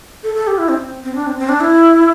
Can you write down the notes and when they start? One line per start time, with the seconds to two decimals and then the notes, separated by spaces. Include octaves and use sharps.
0.23 A4
0.35 A4
0.47 G4
0.58 E4
0.69 C4
1.04 C4
1.15 D4
1.27 C4
1.39 C4
1.49 D4
1.60 E4